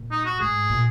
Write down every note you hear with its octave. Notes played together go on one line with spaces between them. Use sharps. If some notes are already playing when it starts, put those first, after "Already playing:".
Already playing: A#2
D#4
F#4
G#2 G#4
A#2